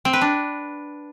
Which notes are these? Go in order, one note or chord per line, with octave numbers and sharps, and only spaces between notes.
C4
B4
D4